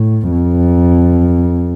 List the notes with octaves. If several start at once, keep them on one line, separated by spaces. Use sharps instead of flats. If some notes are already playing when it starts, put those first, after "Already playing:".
Already playing: A2
F2